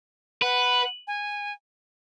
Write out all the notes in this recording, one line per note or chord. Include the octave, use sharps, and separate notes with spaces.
B4 F#5
G#5